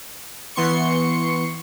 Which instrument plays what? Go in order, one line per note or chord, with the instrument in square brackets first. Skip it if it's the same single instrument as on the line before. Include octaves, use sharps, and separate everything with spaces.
[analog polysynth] E3 B3 C6 C#6 C#7